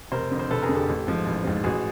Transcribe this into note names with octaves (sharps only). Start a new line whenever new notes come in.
F1 A#4 C5
F2 D3
C5
F1 A4 B4
G#4 A#4
F2 D3
G4 A4
A1
G#2 F3
A1
G#2 F3
A1 F#4 G#4